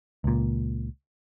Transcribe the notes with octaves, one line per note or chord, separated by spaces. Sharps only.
C#2 A#2